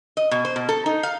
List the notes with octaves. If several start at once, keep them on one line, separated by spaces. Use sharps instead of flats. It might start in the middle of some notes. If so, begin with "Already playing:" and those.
D#5
B2
C5
B2
A4
D#4
F5